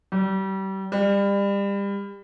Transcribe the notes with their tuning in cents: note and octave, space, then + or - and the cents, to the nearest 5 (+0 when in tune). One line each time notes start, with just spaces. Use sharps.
G3 -30
G3 +30